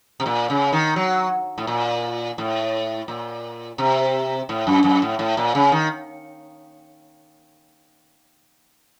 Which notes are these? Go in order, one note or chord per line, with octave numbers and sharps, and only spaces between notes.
C3
A#2
C#3
D#3
F#3
A2
A#2
A2
A#2
C3
A2
F#2
F#2
A2
A2
A#2
C#3
D#3